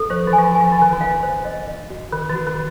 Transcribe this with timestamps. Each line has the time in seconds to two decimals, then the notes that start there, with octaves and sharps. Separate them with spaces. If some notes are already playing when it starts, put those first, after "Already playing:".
Already playing: A4
0.10 F3 C5
0.27 E3
0.33 G#5
0.38 F3
0.44 E3
0.55 G#5
0.61 F3
0.72 E3
0.78 D#3 G#5
0.93 E3
1.01 F5
1.23 C5
1.45 D#5
1.68 D#5
1.90 F#4
2.12 D#3 B4
2.30 E3
2.35 F#4
2.47 D#3